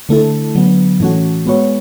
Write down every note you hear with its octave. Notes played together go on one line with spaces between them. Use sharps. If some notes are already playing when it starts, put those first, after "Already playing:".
D3 A3 E4 A4
D3 F#3 B3
A2 E3 A3 C#4 F#4
G#3 B3 F#4 C#5